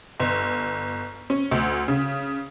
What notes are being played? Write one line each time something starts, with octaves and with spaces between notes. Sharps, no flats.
G1
C#4
D2
C#3